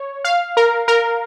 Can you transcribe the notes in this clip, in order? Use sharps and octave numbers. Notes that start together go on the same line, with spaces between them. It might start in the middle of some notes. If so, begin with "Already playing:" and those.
Already playing: C#5
F5
A#4
A#4